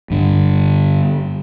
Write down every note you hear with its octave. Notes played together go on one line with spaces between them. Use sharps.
G2 D3